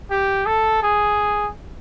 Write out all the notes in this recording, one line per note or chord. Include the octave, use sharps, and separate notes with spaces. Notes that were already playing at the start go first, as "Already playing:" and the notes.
G4
A4
G#4